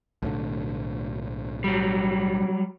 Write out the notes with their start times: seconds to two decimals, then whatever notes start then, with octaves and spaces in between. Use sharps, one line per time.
0.22 B1 A2 D3
1.64 F#3 G3